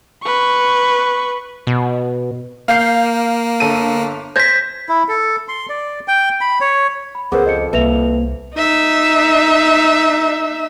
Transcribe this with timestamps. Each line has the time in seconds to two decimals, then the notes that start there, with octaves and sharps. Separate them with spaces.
0.23 B4 C#6
1.67 B2
2.68 A#3 F5 G6 C7
3.60 G1 A4 D#7
4.36 C5 G6 G#6 A#6 B6
4.89 E4
5.08 A4
5.48 C6
5.69 D5
6.08 G5
6.41 B5
6.61 C#5
7.15 B5
7.32 C#2 B3 G#4 A#4 C5
7.46 F2 D#5 C#7
7.73 C2 A#3 B4 E5 F7
8.56 D#4 E5